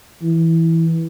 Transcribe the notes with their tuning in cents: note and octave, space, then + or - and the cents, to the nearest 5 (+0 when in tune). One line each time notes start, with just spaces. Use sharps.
E3 -10